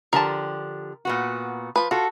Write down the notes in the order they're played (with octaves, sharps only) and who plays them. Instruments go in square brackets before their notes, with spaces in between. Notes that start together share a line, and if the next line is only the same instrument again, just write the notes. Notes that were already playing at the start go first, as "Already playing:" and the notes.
[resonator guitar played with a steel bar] D3 F3 G4 [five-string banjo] A#4 A5
[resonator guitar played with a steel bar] A#2 B3 F#4
[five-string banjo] F3 B4
[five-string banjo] F4 [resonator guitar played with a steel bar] F#4 A4